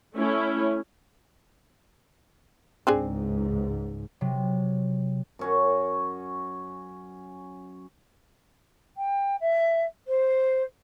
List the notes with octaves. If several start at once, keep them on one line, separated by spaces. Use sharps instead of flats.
A3 C#4 E4
C#2 G#2 C4 D4 G#4
C3 F#3
F#2 C#4 F#4
G5
E5
C5